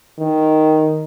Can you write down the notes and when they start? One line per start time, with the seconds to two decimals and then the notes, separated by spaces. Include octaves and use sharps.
0.19 D#3